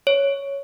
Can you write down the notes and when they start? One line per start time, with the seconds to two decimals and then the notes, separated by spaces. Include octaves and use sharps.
0.07 C#5